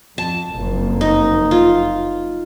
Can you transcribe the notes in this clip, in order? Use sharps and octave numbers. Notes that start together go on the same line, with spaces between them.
F2 A5
F#1 F2 A#3
D#4
F4